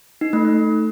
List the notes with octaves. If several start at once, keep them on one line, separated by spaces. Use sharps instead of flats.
D#4
A3
A3